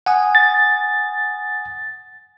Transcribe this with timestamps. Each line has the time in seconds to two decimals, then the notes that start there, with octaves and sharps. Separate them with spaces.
0.06 F#5 G#5 D#6
0.35 A6